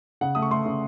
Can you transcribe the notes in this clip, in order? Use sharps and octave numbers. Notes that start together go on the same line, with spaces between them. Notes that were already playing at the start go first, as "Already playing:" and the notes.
C#3 F#5
A3 D#6
C#6
A3 C6
C#3